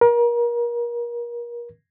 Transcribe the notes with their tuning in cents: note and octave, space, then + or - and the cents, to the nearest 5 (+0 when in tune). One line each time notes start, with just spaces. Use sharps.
A#4 +35